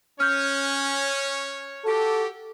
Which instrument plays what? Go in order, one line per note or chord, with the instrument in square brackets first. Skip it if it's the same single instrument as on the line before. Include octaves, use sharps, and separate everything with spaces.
[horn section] C#4 [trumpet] C#5 [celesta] F6 G6
[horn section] F#4 G4 [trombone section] A4